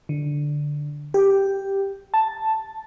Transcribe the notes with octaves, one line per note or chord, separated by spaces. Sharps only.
D3
G4
A5